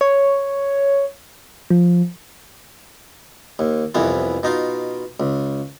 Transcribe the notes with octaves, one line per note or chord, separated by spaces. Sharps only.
C#5
F3
D#2
C2 F2 E3 B3 E4
B2 D#4 F4
C#2